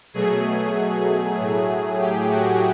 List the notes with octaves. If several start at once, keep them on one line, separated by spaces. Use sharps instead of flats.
B2 F#3 A3 G#4
A2 F#3 A3
G4
F#4